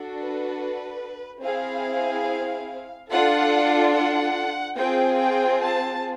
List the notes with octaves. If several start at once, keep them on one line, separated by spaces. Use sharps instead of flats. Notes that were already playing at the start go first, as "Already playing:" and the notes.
Already playing: D4 F#4 A4
B4
C4 E4 G#4 F5
D4 F4 A4 F#5
F#5
C4 F4 G#4 G5
G5
A5